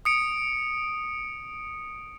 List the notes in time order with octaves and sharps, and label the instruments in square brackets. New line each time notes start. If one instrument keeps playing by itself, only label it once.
[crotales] D#6 C#7 D7